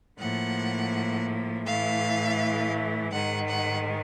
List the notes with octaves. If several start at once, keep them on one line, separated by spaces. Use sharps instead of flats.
A2 F3 A#3 F#5
A2 E3 A3 F5
G#2 D#3 G#3 F#5
F#5